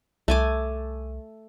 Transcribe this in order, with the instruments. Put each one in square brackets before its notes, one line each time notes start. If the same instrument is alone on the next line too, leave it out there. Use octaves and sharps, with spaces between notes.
[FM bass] C2 [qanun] A3 G#5 D6